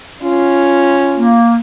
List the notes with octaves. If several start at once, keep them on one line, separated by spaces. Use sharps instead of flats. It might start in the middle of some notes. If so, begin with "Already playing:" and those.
C#4 F4
A#3